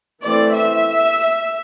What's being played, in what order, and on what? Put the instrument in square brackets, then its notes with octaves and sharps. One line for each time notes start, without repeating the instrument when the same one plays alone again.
[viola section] E3 A3 C4 D5
E5